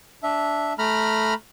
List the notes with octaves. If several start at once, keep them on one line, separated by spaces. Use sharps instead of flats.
D4 E5
A3 A#5 B5 F6